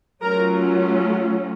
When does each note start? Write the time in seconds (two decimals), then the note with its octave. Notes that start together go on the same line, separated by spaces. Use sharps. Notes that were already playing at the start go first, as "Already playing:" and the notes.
0.22 F#3 A3 C#4 F4 A#4 A#5